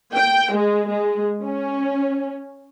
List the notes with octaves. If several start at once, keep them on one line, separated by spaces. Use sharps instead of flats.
G5
G#3
G#3
C#4